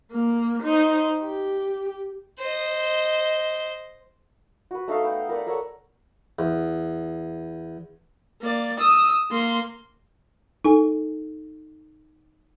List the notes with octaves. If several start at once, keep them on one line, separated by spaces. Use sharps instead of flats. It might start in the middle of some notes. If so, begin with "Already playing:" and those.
A#3
D#4 C5
G4
C5 D#5
F#4 B4
A3 D#4 A4 F5
A3 B3 G5
A#4 B4 D5 F#5
A4 A#4 C#5 F#5
E2
A#3 D5
D#6 E6
A#3 C6
D#4 A4 G#5